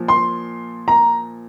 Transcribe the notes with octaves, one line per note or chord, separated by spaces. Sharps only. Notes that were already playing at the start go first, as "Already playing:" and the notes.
Already playing: A#2 F3
C6
A#5